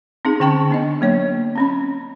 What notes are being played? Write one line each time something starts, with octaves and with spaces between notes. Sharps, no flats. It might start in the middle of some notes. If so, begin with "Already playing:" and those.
C4 D#4 G#4
D3 C#4 G5 A5 C#6
B3 D4 D#5
F#3 A#3 C#5
C4 C#4 B5